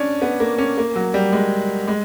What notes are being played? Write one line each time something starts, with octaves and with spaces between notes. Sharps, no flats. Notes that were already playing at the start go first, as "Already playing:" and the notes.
Already playing: C#4 D4
B3
A#3
C#4
A#3
F#3
G3
G#3
G#3